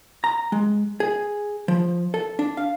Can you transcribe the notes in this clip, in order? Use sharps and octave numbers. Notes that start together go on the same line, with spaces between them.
A#5
G#3
G#4
F3
A4
D4
F5